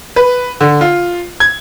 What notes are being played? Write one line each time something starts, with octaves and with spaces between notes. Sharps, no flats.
B4
D3
F4
G#6